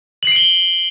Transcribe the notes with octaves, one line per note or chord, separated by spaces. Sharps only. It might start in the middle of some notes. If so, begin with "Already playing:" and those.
C7 D7 F#7 G7